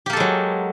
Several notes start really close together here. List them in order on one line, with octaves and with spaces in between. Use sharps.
G4 A#3 A4 G#3 F#3